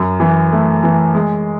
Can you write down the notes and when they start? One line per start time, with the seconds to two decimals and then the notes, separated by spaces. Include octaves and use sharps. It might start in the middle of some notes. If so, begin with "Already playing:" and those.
Already playing: F#2
0.20 E3
0.53 A3
0.84 E3
1.14 G#3